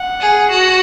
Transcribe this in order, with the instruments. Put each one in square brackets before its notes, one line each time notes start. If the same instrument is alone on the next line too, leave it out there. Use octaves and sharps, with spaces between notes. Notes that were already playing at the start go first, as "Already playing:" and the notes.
Already playing: [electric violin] F#5
[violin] G#4
F#4